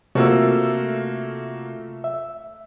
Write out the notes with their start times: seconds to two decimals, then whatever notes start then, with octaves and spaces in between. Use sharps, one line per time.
0.15 C3 A3 A#3 F4 F#4 E6
2.04 E5